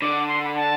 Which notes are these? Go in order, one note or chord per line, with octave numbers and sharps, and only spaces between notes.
D3 D6
C6
B5
A5